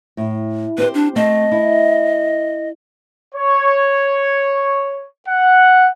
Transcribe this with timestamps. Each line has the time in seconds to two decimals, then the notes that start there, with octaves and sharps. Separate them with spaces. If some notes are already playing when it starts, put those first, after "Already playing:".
0.17 A2
0.78 C4 G4 B4 C5
0.94 D4
1.16 A3 C4 D#5
1.52 E4
3.35 C#5
5.28 F#5